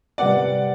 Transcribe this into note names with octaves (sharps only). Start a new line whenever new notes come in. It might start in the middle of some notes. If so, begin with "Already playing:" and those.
C3 G3 B3 D5 F#5